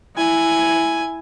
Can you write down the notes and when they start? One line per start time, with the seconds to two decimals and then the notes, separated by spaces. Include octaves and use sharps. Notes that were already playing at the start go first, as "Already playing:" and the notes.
0.16 E4 G#5